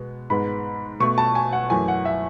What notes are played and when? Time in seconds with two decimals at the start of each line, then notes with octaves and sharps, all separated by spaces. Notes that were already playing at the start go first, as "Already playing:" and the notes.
Already playing: B2 G#3 B3
0.30 G#2 G#3 B3 B5
1.00 B2 A3 C#6
1.18 A5
1.35 G#5
1.53 F#5
1.70 F#2 E3 A3 G#5
1.88 F#5
2.05 E5